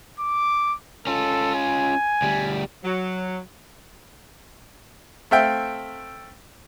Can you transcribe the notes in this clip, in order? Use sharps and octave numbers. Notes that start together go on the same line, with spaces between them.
D6
C#4 F4 A4
G#5
D2 G3
F#3
A3 C4 E5 F5 G5